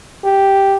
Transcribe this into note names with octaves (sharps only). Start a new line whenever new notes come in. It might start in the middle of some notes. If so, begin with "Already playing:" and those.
G4